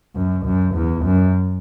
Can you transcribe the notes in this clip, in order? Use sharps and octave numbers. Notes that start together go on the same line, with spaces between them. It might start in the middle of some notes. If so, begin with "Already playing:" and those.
F#2
F#2
E2
F#2